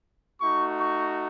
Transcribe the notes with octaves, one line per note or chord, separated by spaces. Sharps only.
A3 D#4 F#4 C#6
C#6